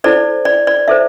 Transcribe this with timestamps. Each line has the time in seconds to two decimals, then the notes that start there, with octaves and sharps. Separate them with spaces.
0.04 E4 A4 C5 D5
0.45 D5
0.67 D5
0.88 E4 A4 C5 E5